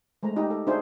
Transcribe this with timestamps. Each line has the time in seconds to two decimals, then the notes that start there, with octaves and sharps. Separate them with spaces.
0.23 G#3 A3 C5 A#5
0.36 D#4 G4 D#5
0.50 A4
0.67 D4 D#4 F#4 G#4 C5 E5